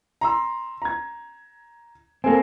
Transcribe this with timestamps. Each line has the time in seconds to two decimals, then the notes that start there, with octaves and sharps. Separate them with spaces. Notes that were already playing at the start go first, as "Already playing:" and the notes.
0.21 A#5 C6 E6
0.82 A#5 G#6
2.24 A#3 C4 A4 G#5